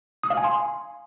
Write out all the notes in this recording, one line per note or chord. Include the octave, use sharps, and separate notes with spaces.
D#6
F5
G#5
C6